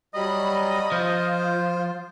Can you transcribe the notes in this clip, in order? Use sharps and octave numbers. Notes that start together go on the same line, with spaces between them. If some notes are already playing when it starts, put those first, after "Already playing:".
F#3 G3 D#5 B5
F3 F4 C5